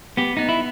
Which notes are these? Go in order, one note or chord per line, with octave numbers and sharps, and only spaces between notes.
B3 G4
B3 D#4
E4